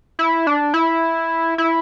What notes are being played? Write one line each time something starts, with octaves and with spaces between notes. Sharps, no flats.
E4
D4
E4
E4